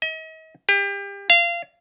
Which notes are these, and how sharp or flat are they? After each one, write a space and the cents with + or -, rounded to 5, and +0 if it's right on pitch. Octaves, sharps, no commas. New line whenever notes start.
D#5 +40
G4 +30
F5 -25